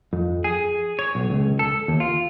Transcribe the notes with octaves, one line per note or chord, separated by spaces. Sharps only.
F2
G#4
C#5
B1
C#2
A4
D#2
F4